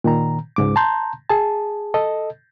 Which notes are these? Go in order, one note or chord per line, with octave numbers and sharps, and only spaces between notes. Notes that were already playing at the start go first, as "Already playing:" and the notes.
A#2 D#3 A#5
C#2 G#2 D6
A5 A#5 C6 G6
G#4 A5
A4 D#5